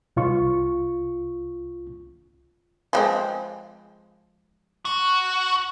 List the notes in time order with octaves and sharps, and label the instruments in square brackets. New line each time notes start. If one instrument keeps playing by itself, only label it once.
[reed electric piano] C2 F4 C#6
[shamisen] F3 G#3 C4
[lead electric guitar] F#4